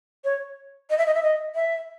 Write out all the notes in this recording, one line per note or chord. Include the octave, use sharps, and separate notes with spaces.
C#5
D#5
E5
D#5
E5
D#5
E5